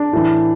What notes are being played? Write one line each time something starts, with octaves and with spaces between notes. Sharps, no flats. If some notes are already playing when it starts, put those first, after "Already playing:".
Already playing: D4
A2 E3